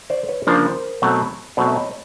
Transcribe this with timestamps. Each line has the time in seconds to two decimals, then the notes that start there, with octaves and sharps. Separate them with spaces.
0.10 C5 D5
0.28 B4 C#5
0.47 C#3 F3 A#3 D4 A#4 C5
1.02 B2 F#3 A3 C4
1.57 B2 F#3 A3 C4 C5 D5
1.68 E5
1.76 C#5 D#5